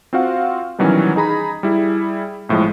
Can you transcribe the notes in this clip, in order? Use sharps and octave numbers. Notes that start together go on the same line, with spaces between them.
C4 F4 F#4 F5 F#5
B2 D#3 E3 F#3 G3 C#4
D#4 G#4 A#5 B5
G3 E4 G#4
B1 A2 F3 G#3